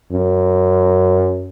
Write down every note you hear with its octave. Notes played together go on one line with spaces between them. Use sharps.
F#2